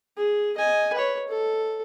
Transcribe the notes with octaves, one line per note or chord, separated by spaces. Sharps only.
G#4
D#5 G#5
B4 C#5
A4